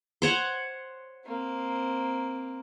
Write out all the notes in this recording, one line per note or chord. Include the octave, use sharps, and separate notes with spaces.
C5 C#5 F#5
A#3 C4